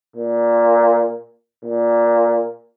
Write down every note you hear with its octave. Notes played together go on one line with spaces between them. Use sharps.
A#2
A#2